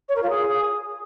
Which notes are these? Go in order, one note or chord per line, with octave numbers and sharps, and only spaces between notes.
C#5
A#4
F4
G#4